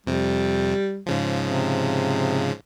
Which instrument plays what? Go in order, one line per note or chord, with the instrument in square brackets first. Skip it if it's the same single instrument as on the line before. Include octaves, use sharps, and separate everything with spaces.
[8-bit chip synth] F2 C3 [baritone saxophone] G3
[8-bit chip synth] G#2 C#3 F3
[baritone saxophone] C3